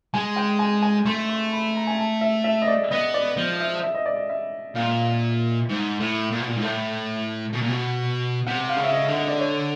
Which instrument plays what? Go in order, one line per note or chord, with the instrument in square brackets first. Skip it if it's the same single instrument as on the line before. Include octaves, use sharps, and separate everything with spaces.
[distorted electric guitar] G#3 [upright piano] G#5
[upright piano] G5
G#5
G#5
[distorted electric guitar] A3 [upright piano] C6
[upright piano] C6
B5
A#5
G#5
A5
E5
E5
D#5
D5
[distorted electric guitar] B3 [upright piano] D#5
[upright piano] D5
[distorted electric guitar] F3
[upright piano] E5
E5
D#5
D5
D#5
E5
[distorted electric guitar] A#2 [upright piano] F5
[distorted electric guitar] G#2
A2
A#2
B2
A#2
G#2
A2
B2
A#2
B2
[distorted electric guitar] C3 [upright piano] F#5
[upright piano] F5
[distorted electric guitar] C#3
[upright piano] E5
D#5
[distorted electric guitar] D3
[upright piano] D#5
D5
C#5